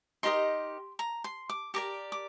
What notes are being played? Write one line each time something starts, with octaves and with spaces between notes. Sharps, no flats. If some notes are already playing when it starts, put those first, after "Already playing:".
D#4 G4 A#4 D#5 C6
A#5
C6
D6
G4 A#4 D5 D6
D6